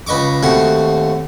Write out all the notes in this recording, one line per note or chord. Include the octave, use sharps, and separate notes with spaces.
C#2 B4 D#5 C#6 D6
D#2 A3 C4 F#4 F#5